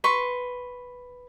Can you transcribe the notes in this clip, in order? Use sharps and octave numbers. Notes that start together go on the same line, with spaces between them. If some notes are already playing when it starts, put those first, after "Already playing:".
B4 C6 C#6